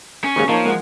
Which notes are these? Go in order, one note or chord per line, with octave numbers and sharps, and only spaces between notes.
C#4
D#2 G#2 C#3 C#6
F3 A#3 D#4 C#5 A5
G#3 A#4 F#5